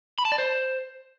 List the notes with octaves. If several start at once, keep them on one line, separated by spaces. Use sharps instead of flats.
B5
A5
D5
C5